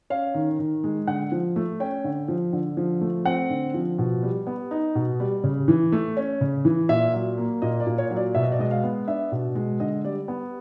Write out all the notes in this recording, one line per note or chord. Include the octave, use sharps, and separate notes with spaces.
C#4 F5
D#3
D#3
G#3
D3 F#5
F3
A3
C#4 G5
D3
F3
D3
F3
A3
C4 F#5
D3
F3
B2
G3
B3
D#4
B2
G3
C#3
E3
A3
C#4
C#3
E3
A#2 E5
F#3
A#3
A#2 D#5
D5
A#2
C#5
F#3
D5
B2 E5
D#5
D5
G#3 D#5
F5
B3
D4 E5
B2
G#3
D3 D#5
G3 D5
B3